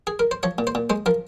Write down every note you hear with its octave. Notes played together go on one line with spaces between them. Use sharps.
G#4
A#4
C5
F3 C#5
A#2
C5
A#2
G#3 C5
F3 A#4